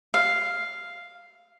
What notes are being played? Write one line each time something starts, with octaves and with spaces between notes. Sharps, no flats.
F5